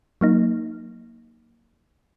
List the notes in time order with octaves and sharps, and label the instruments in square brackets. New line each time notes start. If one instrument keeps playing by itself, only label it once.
[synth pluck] F#3 A#3 D#4